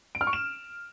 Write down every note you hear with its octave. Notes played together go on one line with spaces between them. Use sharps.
D7
F6
C#6
E7